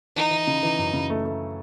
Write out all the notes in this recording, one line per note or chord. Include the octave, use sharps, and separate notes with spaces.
E3 D#4
E3
C#3
E3
F#2
C#3
A3
A3